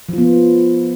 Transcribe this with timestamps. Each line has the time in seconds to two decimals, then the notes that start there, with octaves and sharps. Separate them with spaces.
0.09 F3
0.13 F4
0.18 B3